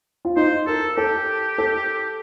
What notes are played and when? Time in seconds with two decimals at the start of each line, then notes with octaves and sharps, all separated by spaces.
0.25 F4
0.36 D#4 C5
0.67 A4 A#4
0.97 G4 A4
1.58 A4